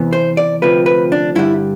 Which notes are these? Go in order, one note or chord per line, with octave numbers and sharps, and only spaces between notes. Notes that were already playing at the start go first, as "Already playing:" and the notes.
Already playing: E2 C3 E3 B3
C5
D5
D2 C3 F3 C4 B4
B4
D4
G2 D3 G3 E4